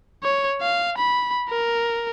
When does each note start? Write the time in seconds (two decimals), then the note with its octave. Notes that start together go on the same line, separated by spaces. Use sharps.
0.23 C#5
0.61 F5
0.98 B5
1.50 A#4